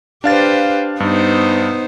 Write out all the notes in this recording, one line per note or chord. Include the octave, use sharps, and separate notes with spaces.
D4 G4 B4 C5 F5 A6
G2 B3 D#4 C5